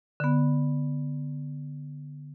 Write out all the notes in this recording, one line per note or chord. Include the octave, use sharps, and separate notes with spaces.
D3 B3